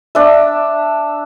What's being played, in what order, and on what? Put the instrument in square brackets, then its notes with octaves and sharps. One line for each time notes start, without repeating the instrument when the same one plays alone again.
[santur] D4 E5